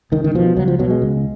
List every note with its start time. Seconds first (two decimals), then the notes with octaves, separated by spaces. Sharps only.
0.12 C#2 D#3
0.24 D#3
0.35 B2 F3
0.56 C#2 F#3
0.68 F3
0.79 B2 F#3
0.90 G#3
1.02 C#2